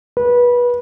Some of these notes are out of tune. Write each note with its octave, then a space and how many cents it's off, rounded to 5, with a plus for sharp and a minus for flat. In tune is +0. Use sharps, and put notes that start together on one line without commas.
B4 -25